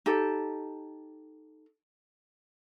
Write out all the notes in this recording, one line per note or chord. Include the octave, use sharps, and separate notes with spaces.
D#4 G4 A4